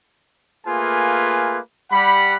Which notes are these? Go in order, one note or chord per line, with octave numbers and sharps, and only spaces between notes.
A3 A#3 F4 G#4 B4 G#5
G3 F#5 B5